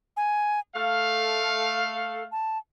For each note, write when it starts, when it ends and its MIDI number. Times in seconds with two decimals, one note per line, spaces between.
0.17 0.59 80
0.75 2.28 57
0.75 2.24 69
0.75 2.28 77
2.32 2.58 81